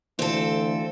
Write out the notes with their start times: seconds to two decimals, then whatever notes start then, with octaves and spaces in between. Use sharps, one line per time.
0.19 D2 E3 C4 A4 C5 F5